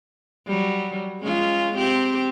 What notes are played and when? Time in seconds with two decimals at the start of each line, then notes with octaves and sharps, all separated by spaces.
0.47 F#3 G3
1.20 G#3 C#4 F4
1.75 C4 G4